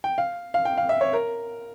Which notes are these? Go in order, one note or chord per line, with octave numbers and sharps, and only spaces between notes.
G5
F5
F5
G5
F5
E5
C#5
A#4